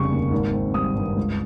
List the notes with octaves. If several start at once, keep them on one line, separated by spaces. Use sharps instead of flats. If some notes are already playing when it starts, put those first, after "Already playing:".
Already playing: F1 C#3 G3 C#6
D#2
G#1
C4
G3 D#6
G2
C#2